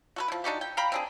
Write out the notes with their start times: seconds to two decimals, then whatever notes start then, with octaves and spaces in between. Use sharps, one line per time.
0.16 F#4 A4 B4
0.28 F3 E4
0.44 D4 D#4 F#4 G4
0.61 G5
0.77 F5 G5 A#5 B5
0.92 C4 D4 G#4